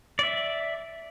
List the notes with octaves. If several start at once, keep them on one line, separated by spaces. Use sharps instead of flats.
D5 E5